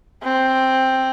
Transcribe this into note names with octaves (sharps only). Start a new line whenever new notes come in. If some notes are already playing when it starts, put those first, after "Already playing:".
C4